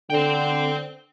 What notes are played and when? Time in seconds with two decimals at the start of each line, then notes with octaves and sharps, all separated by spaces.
0.10 D3 C5 G5